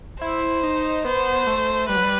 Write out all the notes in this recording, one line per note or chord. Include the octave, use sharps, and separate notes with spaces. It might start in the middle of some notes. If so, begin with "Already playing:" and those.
E4 C5
D#4
B3 C5
A3
G3 B4
F#3
G3